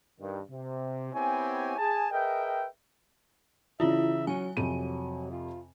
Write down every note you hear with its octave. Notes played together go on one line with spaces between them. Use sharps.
G2 D#3
C3
B3 C4 E4 G4 C#5 G#5
G#4 G#5 A5
G#4 A#4 B4 D#5 E5 G5
C#3 E3 E4 F4 E5
F#3 C#4 G#5
F2 C3 F#3 D#7
F4